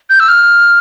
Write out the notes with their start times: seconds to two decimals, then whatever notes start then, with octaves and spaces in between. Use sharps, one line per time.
0.10 G6
0.20 E6
0.28 F6